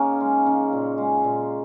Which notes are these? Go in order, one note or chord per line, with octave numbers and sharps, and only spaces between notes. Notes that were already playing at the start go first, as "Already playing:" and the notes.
Already playing: C#3 A#3 C#4 D#4
G#3
C#3
A#2
G#3
A#2